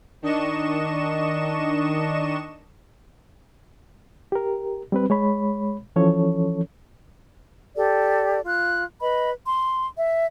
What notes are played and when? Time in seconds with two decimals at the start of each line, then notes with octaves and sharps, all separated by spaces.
0.22 D#3 D4 D#5 C#6 E7
4.32 G4 A#4
4.92 G3 C4 B4
5.10 G#3 C#5 B5
5.96 E3 F3 C#4 A4 C#5
7.76 G4 A4 D5
8.45 F4 F#6
9.01 B4 D#5 B5
9.46 C6
9.97 E5